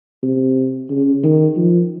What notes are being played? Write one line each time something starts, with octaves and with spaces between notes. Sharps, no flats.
C3
C#3
D#3
F3